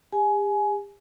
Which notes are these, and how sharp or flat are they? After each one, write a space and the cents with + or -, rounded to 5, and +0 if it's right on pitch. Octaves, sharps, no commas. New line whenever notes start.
G4 +45 G#5 +20